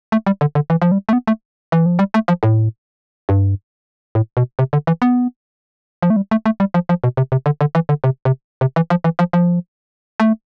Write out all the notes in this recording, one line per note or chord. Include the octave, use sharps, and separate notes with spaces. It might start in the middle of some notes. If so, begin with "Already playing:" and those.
A3
G3
D3
D3
E3
F3
G3
A3
B3
A3
E3
F3
G3
A3
F3
A2
G2
A2
B2
C3
D3
E3
B3
F3
A3
G3
A3
A3
G3
F3
F3
B2
C3
C3
D3
D3
E3
D3
C3
C3
C3
E3
F3
E3
F3
F3
A3